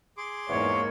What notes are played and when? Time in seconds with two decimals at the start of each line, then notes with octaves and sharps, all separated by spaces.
0.17 G#4 C6 D6
0.49 E2 G#2 A#3 C#5